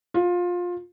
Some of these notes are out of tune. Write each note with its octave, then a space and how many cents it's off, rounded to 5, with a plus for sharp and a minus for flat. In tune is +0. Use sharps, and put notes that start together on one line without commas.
F4 +20